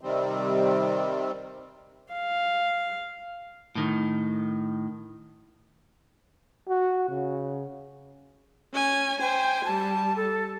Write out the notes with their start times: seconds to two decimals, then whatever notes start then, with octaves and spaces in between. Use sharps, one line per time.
0.01 C3 D#3 G3 C4
2.13 F5
3.75 A2 D#3
6.69 F#4
7.09 C#3
8.74 C#4 G#5
9.20 C5 G5 G#5
9.65 G3 A5
10.17 A4